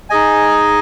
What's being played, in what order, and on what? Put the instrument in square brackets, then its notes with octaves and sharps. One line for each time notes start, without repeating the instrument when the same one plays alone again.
[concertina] D#4 G#4 D#5 G#5